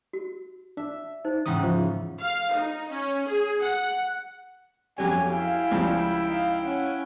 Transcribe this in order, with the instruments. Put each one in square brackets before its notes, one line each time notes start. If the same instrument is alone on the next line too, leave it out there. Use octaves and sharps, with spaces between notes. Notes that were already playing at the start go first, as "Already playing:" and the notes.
[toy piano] F#4
[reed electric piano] D4 [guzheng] E5
[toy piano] D#4 C5
[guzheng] E2 G#2 C#3 [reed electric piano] F#5 G5 D#6
[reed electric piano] F3
[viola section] F5
D#4
C#4
G#4
F#5
[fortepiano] F2 F#3 C#4 [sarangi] G4 [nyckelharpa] C#5 [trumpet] G#5
[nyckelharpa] E4 G5 [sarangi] F5 [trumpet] G#5
[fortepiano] C#2 F3 G3
[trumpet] D#4 [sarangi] F5
[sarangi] C#4 [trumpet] F#5